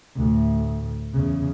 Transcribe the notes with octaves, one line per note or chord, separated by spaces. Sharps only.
D2 A2
E2 C#3